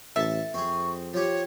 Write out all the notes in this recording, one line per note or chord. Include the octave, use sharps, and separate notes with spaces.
A1 A4 E5 A5
F2 C4 G#4 C#6
F3 G4 C#5